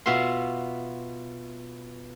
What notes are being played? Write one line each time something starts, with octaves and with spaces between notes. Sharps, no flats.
B2 B3 F4 E5 C6